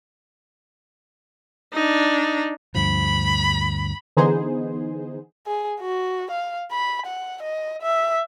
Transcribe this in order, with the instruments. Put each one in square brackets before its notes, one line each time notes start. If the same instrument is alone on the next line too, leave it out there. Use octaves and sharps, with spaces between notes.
[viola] D4 D#4
[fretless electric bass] D2 G2 F3 [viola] B5
[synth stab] D3 E3 B3 D#4 G#4 C5
[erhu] G#4
F#4
F5
B5
F#5
D#5
E5